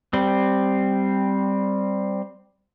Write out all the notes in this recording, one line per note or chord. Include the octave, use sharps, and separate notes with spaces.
G3 C4